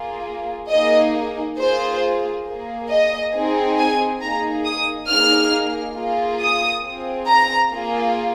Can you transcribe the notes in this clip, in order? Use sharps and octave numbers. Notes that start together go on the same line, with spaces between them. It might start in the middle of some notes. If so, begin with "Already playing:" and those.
Already playing: A#3 F4 G#4
A#3 D#4 G#4 D#5
A#3 F4 G#4 C5
A#3 G#4
D#5
C4 D#4 G#4
G#5
A#3 D#4 G#4 A#5
D#6
A#3 D#4 G#4 F6
A#3 F4 G#4
D#6
C4 F4 G#4
A#5
A#3 F4 G#4